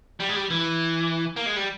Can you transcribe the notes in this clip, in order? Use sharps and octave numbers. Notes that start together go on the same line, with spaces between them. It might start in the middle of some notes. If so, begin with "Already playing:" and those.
G3
G#3
G3
E3
A#3
G#3
G3